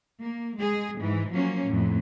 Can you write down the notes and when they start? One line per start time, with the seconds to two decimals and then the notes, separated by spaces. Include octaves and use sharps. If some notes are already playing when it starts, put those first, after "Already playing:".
0.21 A#3
0.58 G#3 G#4
1.00 G#2 E3
1.32 F3 F#3 A#3 C#4
1.67 F2 A2